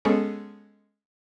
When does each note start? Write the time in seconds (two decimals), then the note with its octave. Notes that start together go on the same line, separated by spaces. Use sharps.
0.05 G#3 B3 C#4 G#4 A4